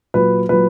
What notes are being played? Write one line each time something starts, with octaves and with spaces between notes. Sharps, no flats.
A#2 F#3 B4
A#2 F#3 B4